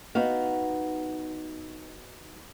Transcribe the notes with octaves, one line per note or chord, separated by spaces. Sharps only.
B3 D#4 F#4 F5